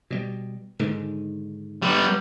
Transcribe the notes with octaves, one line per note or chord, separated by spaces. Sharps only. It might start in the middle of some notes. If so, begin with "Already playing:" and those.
B2 G3
G#2 D3 D#3
G3 B3